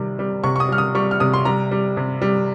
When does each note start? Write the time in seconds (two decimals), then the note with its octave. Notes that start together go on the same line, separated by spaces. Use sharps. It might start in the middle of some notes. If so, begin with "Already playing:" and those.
Already playing: C3 D#3 G3
0.19 G3
0.44 C3 C#6
0.56 C#6
0.60 D#6
0.69 G3 F6
0.78 D#6
0.95 G3 C#6
1.11 F6
1.20 C3 D#6
1.33 C6
1.45 G3 A#5
1.71 G3
1.97 C3
2.22 G3